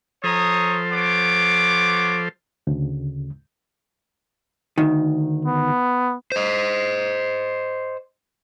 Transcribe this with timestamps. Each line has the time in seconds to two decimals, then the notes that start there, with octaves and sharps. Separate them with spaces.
0.24 F3 A4 C5 C#5 A#5 D#6
0.91 B3 C#5 D6
2.67 D2 C#3
4.78 D2 D#3
5.45 B3
6.32 C5 D#5